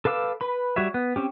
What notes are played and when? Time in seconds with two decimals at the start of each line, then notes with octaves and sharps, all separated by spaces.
0.05 A4 B4 F5 D6 E6
0.41 B4 B5
0.76 G3 F#4 C#5 E5
0.94 B3
1.16 C4 C#4 G4